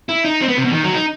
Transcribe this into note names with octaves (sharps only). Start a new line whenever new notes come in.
E4
D#4
C4
B3
C3
B2
D#3
F#3
D#4